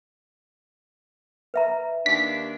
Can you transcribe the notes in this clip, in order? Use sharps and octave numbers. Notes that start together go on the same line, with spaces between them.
B4 E5 A#5
D#2 D4 B6